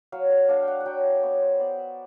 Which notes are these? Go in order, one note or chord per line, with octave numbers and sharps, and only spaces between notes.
F#3 F5
F5
D4 F5
G5
F#5
F#5
F#3 G5
F5
B3 C#5
C5
B3 D5
E5